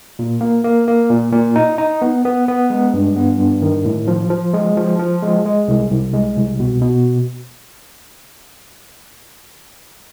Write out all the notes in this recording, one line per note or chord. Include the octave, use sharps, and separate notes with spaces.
A#2
A#3
A#3
A#3
A#2
A#2
D#4
D#4
B3
B3
B3
G#3
G2
B3
G2
D#3
A2
F3
F3
G#3
F3
F3
G#3
G#3
C2
C2
G#3
C2
B2
B2